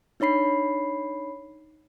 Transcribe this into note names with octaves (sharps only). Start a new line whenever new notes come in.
D4 D#4 C#5 B5 C7